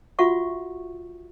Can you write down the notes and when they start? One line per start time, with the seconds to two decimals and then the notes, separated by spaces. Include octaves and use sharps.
0.19 F4 F#4 E5 F#5 C#6